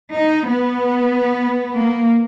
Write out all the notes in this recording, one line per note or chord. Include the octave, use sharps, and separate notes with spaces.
D#4
B3
A#3